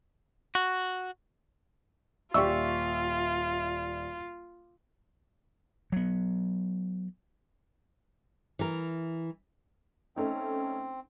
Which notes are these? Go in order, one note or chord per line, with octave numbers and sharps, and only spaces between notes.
F#4
D#1 F4 G4 D5 E5 C#6 E6
F#3 B3
E3 A#4
A3 C4 C#4 D#4